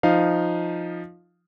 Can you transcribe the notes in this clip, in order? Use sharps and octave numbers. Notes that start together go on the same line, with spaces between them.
F3 D#4 F5